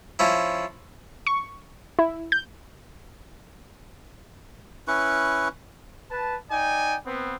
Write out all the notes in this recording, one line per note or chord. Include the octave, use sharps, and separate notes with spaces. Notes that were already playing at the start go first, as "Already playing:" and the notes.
F3 C#4 E4
C#6
E4
G6
C#4 E4 B4 C#6
B4 A5
D#4 D5 G5 G#5
B3 C4